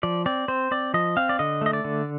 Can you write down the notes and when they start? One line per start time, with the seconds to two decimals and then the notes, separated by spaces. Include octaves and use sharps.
0.03 F3 D5
0.26 C4 D5
0.48 C4 C5
0.71 C4 D5
0.94 F3 D#5
1.17 C4 F5
1.29 D5
1.39 D3 D#5
1.61 A3 D#5
1.73 D5
1.85 D3